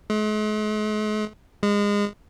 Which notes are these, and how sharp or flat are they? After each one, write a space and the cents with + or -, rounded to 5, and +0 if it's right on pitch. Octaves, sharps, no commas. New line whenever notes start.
G#3 +45
G#3 -25